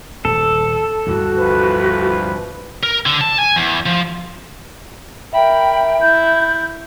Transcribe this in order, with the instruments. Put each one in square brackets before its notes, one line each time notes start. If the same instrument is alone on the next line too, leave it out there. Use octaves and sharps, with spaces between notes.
[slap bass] D#1 [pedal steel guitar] A4
[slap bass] D2 G2 E3 [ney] F#4
[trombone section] C2 F3 B4
[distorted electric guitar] A#4
D3
A5
G#5
E2
F3
[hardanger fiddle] A#4 B5 [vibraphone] E5 [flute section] G5
[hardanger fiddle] E4 [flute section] G6